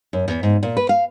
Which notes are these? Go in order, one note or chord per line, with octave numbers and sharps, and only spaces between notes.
F#2
E2
G#2
A#2
B4
F5